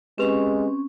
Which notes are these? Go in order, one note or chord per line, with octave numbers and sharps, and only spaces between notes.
G#3 C4 C#4 G4 B4 C#6